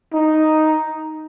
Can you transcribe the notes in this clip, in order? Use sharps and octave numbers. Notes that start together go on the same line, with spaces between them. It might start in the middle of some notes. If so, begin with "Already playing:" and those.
D#4